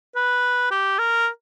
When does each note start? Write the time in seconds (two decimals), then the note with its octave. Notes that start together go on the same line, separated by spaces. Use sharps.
0.16 B4
0.71 G4
0.99 A#4